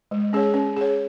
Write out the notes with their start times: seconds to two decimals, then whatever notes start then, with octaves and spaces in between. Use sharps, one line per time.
0.11 G#3
0.33 C#4 G#4 C#5
0.54 C#4
0.77 G#4 C#5